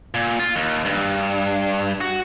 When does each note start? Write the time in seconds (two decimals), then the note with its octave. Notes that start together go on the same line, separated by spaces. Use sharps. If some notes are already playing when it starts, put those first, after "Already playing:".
0.14 A#2
0.39 F4
0.56 D#2
0.85 G2
2.01 F#4